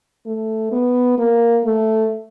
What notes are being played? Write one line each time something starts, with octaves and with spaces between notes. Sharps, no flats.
A3
B3
A#3
A3